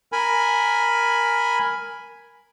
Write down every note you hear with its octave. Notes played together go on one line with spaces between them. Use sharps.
A#4 G#5 B5